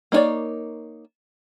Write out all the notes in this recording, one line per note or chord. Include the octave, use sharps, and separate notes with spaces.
A#3 D#4 F4 C#5 D5